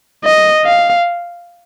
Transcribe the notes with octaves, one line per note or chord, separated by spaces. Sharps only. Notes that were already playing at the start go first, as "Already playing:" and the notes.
D#5
F5